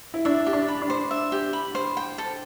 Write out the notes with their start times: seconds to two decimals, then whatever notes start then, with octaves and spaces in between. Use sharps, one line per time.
0.14 E4
0.25 D4 E5
0.47 G4
0.53 D4
0.68 B5
0.82 D4
0.90 C5
1.11 E5
1.32 G4
1.53 B5
1.75 C5
1.97 G5
2.18 A4